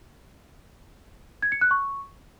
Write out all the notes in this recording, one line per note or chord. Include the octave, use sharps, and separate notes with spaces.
G#6
C#7
F#6
C#6